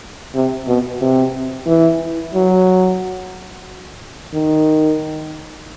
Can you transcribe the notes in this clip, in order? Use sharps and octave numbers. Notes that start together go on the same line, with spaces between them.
C3
B2
C3
E3
F#3
D#3